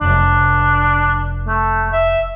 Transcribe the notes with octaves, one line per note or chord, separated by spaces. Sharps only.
F1 D4
A3
E5